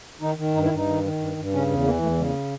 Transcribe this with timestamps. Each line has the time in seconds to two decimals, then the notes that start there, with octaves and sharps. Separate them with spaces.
0.21 D#3 D#4
0.37 D#3
0.54 G2 D#4
0.65 E4
0.71 G2
0.76 D#4
0.87 D#3
1.03 D#3
1.20 G2
1.37 G2
1.53 C#3 C#4
1.69 E2
1.85 E3 A#3
2.02 E2 A3
2.18 C#3 G#3
2.29 A#3